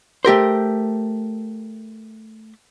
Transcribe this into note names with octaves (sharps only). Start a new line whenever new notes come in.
A3 G4 A#4 C5